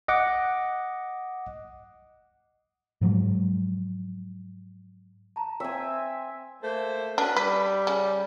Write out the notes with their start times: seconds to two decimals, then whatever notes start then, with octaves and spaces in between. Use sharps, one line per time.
0.08 D#5 F#5 D6
3.01 G#2 F3 F#3 G#3
5.36 A5 A#5
5.60 C4 E5 G#5
6.63 A3 A#3 C5
7.18 C#4 D4 F#4 B4
7.37 G3 B4
7.87 C#3